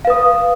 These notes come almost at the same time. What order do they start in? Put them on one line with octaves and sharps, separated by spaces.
F5 B4 D#6